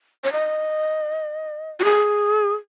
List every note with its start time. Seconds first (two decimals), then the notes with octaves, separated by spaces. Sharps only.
0.24 C#5
0.32 D#5
1.80 F#4
1.84 G#4